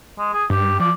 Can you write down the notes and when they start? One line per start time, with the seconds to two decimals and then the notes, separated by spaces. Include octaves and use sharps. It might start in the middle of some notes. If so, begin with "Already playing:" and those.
0.18 G#3
0.33 G#4
0.50 G2 G4
0.80 F3 D5